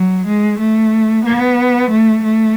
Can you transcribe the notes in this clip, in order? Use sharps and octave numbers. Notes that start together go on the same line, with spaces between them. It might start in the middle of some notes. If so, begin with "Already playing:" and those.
Already playing: F#3
G#3
A3
B3
A3
A3